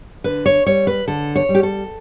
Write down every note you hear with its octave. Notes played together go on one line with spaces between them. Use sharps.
D3 B4
C#5
G3 C#5
B4
D3 A4
C#5
G3
G4
A4